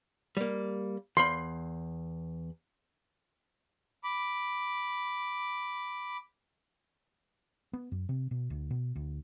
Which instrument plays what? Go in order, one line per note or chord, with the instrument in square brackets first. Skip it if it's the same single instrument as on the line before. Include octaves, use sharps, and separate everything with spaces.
[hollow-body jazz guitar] G3 A#3
[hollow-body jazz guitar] E2 B5 [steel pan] C6
[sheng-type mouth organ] B5 D6
[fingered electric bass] B3
F#2
C3
B2
D2
B2
D2